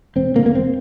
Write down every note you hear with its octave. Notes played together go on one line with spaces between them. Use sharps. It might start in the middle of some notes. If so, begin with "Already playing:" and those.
E1 C4
D2 D3 A#3
A#3
E1 C4